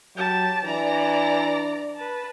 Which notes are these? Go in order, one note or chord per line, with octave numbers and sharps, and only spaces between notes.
F#3 G4 A5
E3 D4 D5 A#5
B4 A5